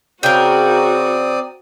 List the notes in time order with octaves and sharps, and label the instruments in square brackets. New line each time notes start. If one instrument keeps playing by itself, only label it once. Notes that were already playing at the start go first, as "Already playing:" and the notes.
[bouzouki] C#3 [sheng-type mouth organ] C4 D5 D#6 [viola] F#4 [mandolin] A#4 G5